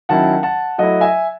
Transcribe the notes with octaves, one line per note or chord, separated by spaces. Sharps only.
D#3 F#3 C#4 E4 F#5 A5
F#5 A5
F#3 A3 E4 D#5 F#5
E5 G#5